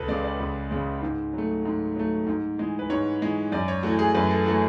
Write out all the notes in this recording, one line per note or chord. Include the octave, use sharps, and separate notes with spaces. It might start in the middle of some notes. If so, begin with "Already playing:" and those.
Already playing: C#2 A4 B4
C#3 G#3 D5
D5
C#2
C#3 G#3
G#2
F#3 A3
G#2
F#3 A3
G#2
E3 G#3
B4
G#2 C#5
E3 G#3
F#2 D5
C#5
E3 A3 F#4
G#4
F#2 B4
A4
E3 A3 F#4